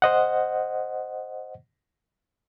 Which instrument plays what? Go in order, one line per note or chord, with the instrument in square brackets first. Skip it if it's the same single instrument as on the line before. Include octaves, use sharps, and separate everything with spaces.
[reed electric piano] C5 D#5 F#5